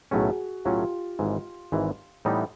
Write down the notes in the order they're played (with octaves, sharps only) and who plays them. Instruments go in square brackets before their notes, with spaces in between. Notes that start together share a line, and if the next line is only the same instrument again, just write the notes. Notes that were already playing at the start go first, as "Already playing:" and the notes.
[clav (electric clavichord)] B1 A2 F#3 A3 C#4 [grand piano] F#4 G#4
[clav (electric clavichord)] B1 A2 F#3 A3 C#4 [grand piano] F4 G4
[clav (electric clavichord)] G#1 G#2 E3
G#1 G#2 E3
A2 E3 G3 B3 D#4